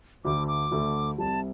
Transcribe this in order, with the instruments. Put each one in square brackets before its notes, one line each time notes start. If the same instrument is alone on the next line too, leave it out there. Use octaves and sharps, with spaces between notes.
[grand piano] D2 D3 A3 [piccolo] D6
[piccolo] D6
[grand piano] D2 D3 A3
[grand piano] C2 C3 G3 [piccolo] A5